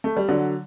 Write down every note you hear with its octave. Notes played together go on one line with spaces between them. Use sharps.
A3
G3
D3 F#3